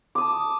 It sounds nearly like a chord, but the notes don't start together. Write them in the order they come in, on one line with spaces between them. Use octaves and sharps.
D6 D#6 A5